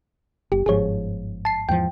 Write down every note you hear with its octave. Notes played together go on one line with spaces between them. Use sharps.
F#1 G4
G1 G#2 F3 G#4 C#5
A5 C7
E2 G#2 F3 G5